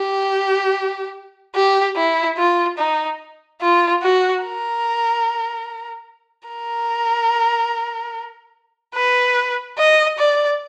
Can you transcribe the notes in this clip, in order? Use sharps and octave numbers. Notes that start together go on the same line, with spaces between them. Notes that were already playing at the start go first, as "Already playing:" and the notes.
Already playing: G4
G4
E4
F4
D#4
F4
F#4
A#4
A#4
B4
D#5
D5